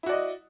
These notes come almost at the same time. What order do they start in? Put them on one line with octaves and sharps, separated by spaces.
E4 F#4 D5 D#5